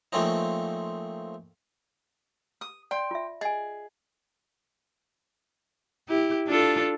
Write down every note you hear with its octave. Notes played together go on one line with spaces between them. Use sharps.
F3 A3 A#3 C4 C#4 D#4
D#6
D5 G5 C6
F4 E5
G#4 D#5 G#5
E4 G4
D4 F4 A4